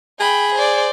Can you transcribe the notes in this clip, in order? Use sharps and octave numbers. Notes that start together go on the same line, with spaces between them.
G#4 G5 B5
C5 D5